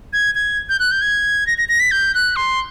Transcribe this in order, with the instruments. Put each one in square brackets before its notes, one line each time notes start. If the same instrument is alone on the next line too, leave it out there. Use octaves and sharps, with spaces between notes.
[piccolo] G#6
G#6
G6
F#6
G6
G#6
A#6
A#6
A#6
B6
G6
F#6
C6